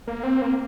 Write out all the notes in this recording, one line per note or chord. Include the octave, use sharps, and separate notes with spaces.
A#3
C4
A#3